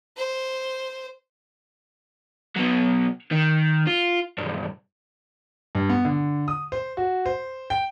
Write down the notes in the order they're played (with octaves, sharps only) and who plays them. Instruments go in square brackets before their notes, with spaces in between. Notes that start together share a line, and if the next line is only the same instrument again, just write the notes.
[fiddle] C5
[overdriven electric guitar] B2 F#3
D#3
F4
B1 G2
[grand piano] G2
B3
D3
D#6
C5
F#4
C5
G5